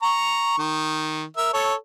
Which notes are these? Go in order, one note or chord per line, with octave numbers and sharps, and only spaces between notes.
A#5 C#6
D#3
A#4 E5
A4 C#5